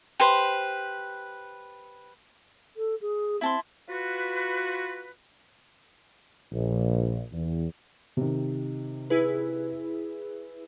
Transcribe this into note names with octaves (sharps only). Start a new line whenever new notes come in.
G4 B4 C5
A4
G#4
C4 E4 A5 C6
F4 F#4 B4
A#1
E2
C3 D#3
E4 G#4 B4